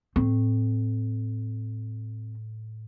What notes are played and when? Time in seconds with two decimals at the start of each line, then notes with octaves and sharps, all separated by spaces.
0.16 A2 C4